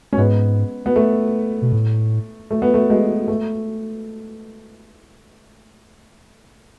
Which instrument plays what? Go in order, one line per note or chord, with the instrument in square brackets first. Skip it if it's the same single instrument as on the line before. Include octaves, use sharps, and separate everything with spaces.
[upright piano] C#4
[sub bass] G#2 [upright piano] G#3 B3
[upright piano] B3
A3
[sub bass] B2
A2
[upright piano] A3
B3
A3
G#3 B3
A3